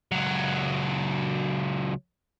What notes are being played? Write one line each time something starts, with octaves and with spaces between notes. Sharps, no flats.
C#2 F#3